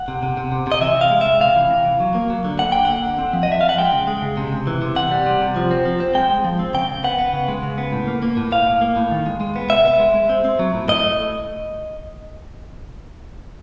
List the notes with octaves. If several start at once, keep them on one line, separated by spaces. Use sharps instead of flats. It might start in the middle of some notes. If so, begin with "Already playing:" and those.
Already playing: F#5
C3
C3
C3
C3
C3 D#5
E3 E5
C3
F5
G#3
C3 E5
C3 F5
E3
C3
E3
F#3
A#3
F#3
D3
A#3 F#5
D3 G5
A#3 F#5
D3
C4
F3
D#5
F3 E5
F3 F5
F#5
G#3 G5
C#3
G#3
C#3
C3
C3
E3
C3
C3 F#5
G3
C3
C3
F3
C4
F3
C4
G#3 G5
G#3
F3
C4
C#3 G5
C#3
B3 F#5
B3
C#3
G#3
C#3
B3
A2
A#3
A#3
A2
A2 F5
A2
A#3
A2
D#3
G#3
G#3
B3
C3 E5
B3
G#3
G#3
C4
C4
F#3
A2
A2 D#5
A3
A2